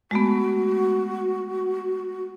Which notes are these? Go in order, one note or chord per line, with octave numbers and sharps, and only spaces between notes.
G#3 A3 B3 F#4